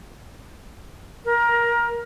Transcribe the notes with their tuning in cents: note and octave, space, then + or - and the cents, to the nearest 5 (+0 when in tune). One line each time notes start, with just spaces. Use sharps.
A#4 +20